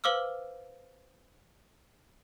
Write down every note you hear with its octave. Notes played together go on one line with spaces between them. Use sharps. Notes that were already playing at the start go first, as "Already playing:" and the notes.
B4 C5 F5 D6 E6 F6